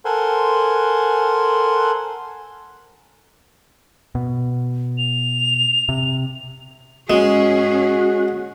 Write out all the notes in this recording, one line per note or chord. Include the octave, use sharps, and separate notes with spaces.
A4 A#4 C5 F#5 G#5 C6
B2
F7
C3
G#2 G#3 C#4 F#4 G#4